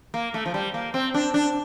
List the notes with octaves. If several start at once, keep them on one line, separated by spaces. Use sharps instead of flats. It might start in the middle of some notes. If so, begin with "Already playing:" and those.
A#3
A3
F3
G3
A#3
C4
D4
D4